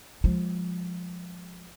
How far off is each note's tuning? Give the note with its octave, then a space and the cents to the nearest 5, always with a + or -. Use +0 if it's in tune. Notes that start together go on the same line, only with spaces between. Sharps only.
F3 +20 G#3 +0